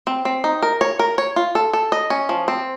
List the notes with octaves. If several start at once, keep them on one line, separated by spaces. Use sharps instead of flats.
C4
C4
D#4
A#4
C#5
A#4
C#5
F4
A4
A4
D#5
C#4
F3
C4